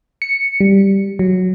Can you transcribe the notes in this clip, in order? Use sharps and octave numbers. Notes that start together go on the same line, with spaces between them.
C#7
G3
F#3